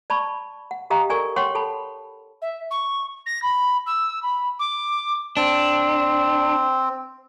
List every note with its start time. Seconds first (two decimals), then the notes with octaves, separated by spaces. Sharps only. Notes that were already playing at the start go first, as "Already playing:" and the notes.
0.10 D5 A5 B5 C#6
0.71 F#5
0.90 G4 D#5 F5 G5 A#5 D#6
1.09 D4 A4 A#4 D5 G#5 C#6
1.36 C#5 F#5 G5 C6 C#6
1.55 A4 A5 B5
2.41 E5
2.71 C#6
3.26 A#6
3.42 B5
3.86 E6
4.22 B5
4.59 D6
5.37 C4 D4